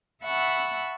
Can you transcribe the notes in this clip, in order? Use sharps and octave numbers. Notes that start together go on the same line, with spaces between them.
E5 F#5 A5 B5 C#6 E6